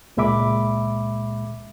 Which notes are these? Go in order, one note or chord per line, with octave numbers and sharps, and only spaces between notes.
C#2 A#2 G#3 E5 B5 D6